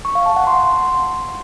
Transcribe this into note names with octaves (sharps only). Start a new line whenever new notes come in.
C#6
F5
A5
F#5
C6